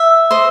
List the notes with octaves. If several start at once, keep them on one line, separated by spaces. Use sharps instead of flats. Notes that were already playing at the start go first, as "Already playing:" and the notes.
Already playing: E5
C5 D#5